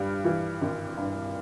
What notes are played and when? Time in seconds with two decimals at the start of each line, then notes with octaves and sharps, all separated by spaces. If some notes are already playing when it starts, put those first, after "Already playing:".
Already playing: G2 G3
0.25 E3
0.61 G#1
0.97 G2